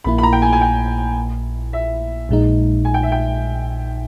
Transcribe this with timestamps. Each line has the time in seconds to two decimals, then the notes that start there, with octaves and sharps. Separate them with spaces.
0.04 A#1 A#2 A#3 E4 B5
0.18 B5
0.23 A#5
0.33 G5
0.42 G#5
0.53 G#5
0.61 G5
1.73 E5
2.29 A#1 A#2 G#3 D#4
2.85 G#5
2.94 G5
3.03 E5
3.12 G5